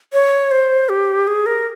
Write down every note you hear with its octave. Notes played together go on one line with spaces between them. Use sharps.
C#5
C5
G4
G#4
A#4